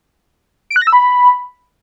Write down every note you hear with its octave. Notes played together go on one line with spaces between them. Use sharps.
D7
F#6
A#6
E6
B5